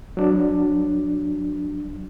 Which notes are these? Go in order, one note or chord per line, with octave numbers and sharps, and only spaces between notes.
F#3 D4